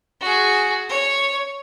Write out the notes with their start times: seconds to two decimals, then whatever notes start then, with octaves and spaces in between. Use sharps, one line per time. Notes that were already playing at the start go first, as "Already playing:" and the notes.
0.21 F#4 G#4
0.89 C#5